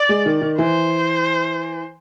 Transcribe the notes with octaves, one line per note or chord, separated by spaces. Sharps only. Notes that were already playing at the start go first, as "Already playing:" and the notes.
Already playing: D5
G#3
D#3
D#3
E3 C5